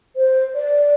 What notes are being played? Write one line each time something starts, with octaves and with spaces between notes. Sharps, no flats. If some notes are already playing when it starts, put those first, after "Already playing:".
C5
D5